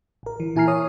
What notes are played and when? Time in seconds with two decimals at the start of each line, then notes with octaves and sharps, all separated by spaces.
0.23 A1 A#4
0.40 E3
0.56 A#2 E4 G#5 A#5 F6 C7
0.68 C#5 D#6